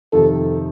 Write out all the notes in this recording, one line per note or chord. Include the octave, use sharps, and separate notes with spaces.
F2 C3 D#3 A4